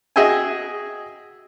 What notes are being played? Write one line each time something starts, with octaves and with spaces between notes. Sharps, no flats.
F#4 G#4 D#5 E5 G5 G#5